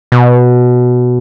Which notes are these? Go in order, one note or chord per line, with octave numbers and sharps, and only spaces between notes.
B2